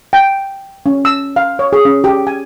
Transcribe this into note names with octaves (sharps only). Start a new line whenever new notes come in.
G5
C#4
E6
F5
C#5
G#4
C#4
G4
G#5